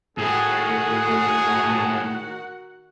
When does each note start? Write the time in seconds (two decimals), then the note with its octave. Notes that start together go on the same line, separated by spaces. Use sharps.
0.18 A2 D#3 A3 F#4 G#4 F#5